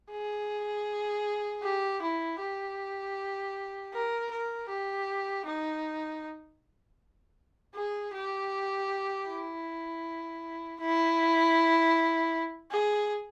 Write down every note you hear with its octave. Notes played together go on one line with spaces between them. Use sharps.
G#4
G4
E4
G4
A#4
A#4
G4
D#4
G#4
G4
E4
E4
G#4